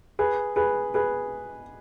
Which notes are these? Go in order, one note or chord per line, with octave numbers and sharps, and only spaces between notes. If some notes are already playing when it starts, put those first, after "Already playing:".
G#4 B4
G#4 B4
G#4 B4